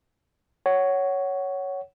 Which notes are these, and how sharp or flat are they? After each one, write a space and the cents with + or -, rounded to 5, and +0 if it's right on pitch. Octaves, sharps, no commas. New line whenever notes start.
C#5 +5 F#5 +15